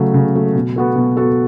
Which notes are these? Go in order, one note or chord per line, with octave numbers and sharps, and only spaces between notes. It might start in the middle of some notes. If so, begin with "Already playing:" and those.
Already playing: C#3 F#3 A3
C#3
F#3 A3
B2
B3 F#4 A4
B2
B3 F#4 A4